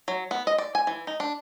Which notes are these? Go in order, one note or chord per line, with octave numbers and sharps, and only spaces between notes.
F#3
B3
D#5
D5
G#5
E3
D#4
D4